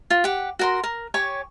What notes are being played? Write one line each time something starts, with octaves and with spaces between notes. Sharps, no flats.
F4
G4 F#5
F#4 A#4 C6
A#4
G4 C#5 G#5 C#6